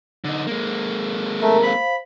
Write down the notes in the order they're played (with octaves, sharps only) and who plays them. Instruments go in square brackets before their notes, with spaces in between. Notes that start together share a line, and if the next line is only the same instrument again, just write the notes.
[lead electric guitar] D3 D#4
G#3 A#3
[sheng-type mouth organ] A3 [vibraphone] A#4 A#5
[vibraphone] C5 F5 [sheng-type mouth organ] B5